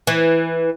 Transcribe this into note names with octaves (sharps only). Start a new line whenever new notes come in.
E3